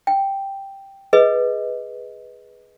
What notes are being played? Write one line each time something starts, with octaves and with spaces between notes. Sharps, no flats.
G5
G#4 B4 D#5